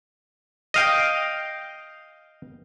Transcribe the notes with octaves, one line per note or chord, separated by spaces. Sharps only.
D#5 F5 G5